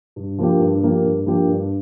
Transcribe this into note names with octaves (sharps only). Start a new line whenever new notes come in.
G2
F3 A#3 D4 G4
G2
F3 A#3 D4 G4
G2
F3 A#3 D4 G4
G2